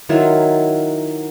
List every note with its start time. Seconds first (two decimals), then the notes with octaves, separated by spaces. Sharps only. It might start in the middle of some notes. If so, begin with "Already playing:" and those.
0.09 D#3 F#3 E4 F4